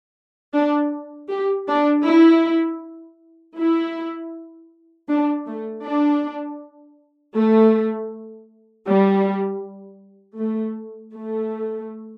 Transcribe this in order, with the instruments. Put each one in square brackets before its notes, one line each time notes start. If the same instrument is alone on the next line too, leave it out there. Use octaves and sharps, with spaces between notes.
[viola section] D4
G4
D4
E4
E4
D4
A3
D4
A3
G3
A3
A3